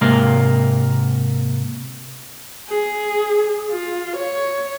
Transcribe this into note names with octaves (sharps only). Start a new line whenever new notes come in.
G#2 C3 A#3 A#4
G#4
F4
C#5